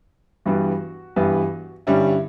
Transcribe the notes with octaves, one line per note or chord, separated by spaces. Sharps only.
G2 E3 G3 B3 F#4
G2 E3 G3 B3
G2 D3 G3 C#4 E4